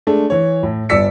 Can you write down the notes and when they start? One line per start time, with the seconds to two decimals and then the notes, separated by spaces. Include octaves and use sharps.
0.07 G#3 A3 D4
0.30 E3 C#5
0.63 A2
0.89 G1 G2 D5 E6 B6 C#7